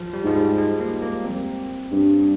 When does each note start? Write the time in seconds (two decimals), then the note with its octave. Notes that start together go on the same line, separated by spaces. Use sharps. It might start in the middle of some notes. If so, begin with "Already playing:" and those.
Already playing: F3
0.14 G3
0.24 G#2 F3
0.35 G3
0.58 G#3
0.80 A#3
1.02 A#3
1.24 C4
1.91 G2